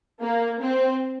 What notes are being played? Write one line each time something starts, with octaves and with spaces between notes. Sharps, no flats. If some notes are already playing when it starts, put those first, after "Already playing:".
A#3
C4